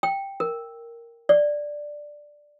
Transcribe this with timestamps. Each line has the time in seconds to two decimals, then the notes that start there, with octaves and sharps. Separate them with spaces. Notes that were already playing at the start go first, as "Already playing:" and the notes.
0.03 G5
0.40 A#4
1.29 D5